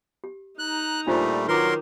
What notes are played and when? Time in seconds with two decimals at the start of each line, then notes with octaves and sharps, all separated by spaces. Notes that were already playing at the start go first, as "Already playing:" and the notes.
0.24 G4
0.59 D#4 A#5 F#6
1.07 A#2 G3 A3 D4 F4 C5
1.48 D#3 F#3 F4 A#4 B4 C6 D6